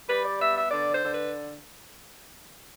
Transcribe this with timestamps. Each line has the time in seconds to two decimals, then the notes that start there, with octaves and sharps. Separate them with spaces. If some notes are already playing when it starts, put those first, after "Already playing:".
0.09 G3 B4
0.25 D5
0.40 B3 E5
0.57 E5
0.71 D3 D5
0.92 C5
1.03 D3
1.13 B4